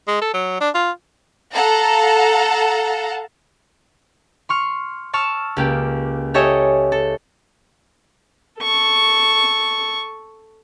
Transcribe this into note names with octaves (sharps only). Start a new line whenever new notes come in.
G#3
A4
F#3
D4
F4
A4 F5 F#5 A5 A#5
C6 C#6 F6
A5 C#6 E6 F6
C#2 A#3 G4
G4 A4 C#5 D#5 E5 G#5
A4
A4 C#6